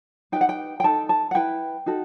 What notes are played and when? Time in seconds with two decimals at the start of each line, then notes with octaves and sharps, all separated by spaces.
0.32 D#4 G4 B4 G5
0.41 F#5
0.49 G5
0.80 G5
0.84 D#4 A4 A5
1.09 A5
1.31 F#5
1.35 E4 B4 G5
1.86 D#4 F#4 A4